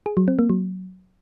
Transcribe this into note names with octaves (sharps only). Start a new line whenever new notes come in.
G#4
F#3
C4
A#3
F#3